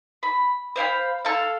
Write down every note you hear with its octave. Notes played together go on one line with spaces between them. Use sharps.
B5
C5 F5 G#5 B5
A4 F5